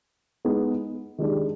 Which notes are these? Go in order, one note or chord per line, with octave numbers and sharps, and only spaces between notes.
G#3 B3 D#4 G#4
D#3 G#3 D4 G4